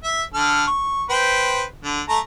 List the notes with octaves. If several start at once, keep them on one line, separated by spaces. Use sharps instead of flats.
E5
D3 A4 F6
C#6
B4 C5 G5
D3
A3 A4 A#5